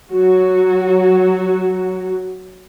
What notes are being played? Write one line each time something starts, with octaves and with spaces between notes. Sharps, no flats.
F#3 F#4